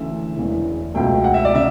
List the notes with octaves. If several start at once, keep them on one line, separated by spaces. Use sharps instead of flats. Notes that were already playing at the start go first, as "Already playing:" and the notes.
Already playing: D2 C#3 E3 A3 E5
E1 E2 C#3 E3
C#2 B2 F#3 A3 G5
F#5
E5
D5
C#3 E5